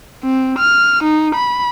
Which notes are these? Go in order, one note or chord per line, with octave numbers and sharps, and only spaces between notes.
C4
F6
D#4
B5